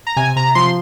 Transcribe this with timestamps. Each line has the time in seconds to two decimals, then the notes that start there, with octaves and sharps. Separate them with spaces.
0.07 A#5
0.17 C3 G#5
0.36 C3 A#5
0.55 F3 C6